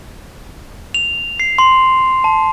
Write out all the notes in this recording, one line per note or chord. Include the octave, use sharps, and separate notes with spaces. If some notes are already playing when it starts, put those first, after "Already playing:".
F7
C7
C6
A5